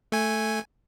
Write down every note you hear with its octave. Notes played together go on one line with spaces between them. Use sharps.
A3 G#5